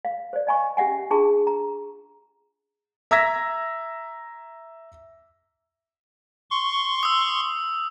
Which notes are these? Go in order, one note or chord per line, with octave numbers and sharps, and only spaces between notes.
F5
C5 D5
D#5 F5 G#5 B5 C#6
C#4 G4 E5 F#5 G#5
D4 F4 G#4 A5 C#6
A#5
E5 A#5 E6 G#6 A#6 B6
C6 C#6
D#6 E6